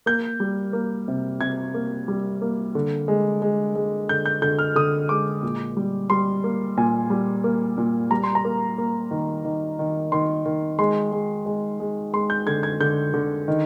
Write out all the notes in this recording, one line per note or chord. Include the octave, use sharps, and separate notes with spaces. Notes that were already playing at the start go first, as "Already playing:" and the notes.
A#3 G6
G3
A#3
C3
C3 G#6
A#3
G3
A#3
D3
G#3
G#3
G#3
D3 G6
G6
D3 G6
F6
D3 D#6
G#3 D6
A#2
G3
G3 C6
A#3
A#2 G#5
G3
A#3
A#2
G3 A#5
C6
A#5
A#3
A#3
D#3
D#3
D#3
D#3 C6
D#3
G#3 C6
G#3
G#3
G#3
G#3 C6
G6
D3 G#6
G#6
D3 G6
D3
D#3